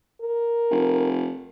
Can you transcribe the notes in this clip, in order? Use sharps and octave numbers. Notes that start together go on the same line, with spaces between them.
A#4
F1